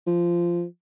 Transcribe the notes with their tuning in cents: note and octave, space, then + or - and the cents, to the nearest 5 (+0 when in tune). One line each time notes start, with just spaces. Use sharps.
F3 -15